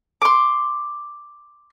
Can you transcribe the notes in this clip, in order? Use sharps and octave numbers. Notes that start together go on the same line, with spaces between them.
C6 D6